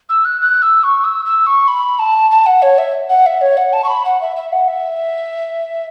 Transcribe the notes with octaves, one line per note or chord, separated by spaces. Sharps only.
E6
F#6
F#6
E6
C#6
E6
E6
C#6
B5
A5
A5
F#5
C#5
E5
F#5
E5
C#5
F#5
A5
C#6
B5
F#5
E5
E5
F#5
E5